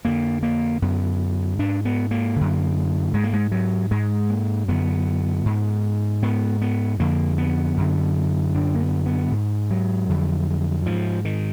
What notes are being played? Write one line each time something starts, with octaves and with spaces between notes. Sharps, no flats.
F2 D3 A#3
A#3
F#2 D3 B3
G#2 D4
B3
A#3
F#2 D3
G#2 G#3
A#3
G#3
F#3
G#2 G#3
A#3
F#2 D3 B3
G#2
G#2 B3
B3
F2 D3 A#3
B3
F#2 D3
F#2 D3 D4
A#3
B3
B3
G#2
F#3
F2 D3
G#2 F3
D#3